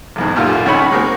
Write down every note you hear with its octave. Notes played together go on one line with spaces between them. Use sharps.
A1 E2 G#2
B1 F#2 A#2 F4 G4 F5
C#2 D#3 C#4 C#5 G#5 B5
G#3 A#3 C4 F#4